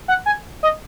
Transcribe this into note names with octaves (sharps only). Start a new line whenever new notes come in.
F#5
G#5
D#5